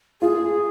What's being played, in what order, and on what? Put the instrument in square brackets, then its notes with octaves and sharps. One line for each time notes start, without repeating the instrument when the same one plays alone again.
[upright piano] F4 [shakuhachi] G#4